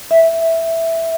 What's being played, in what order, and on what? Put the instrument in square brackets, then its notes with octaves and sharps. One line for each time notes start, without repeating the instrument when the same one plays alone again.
[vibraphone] E5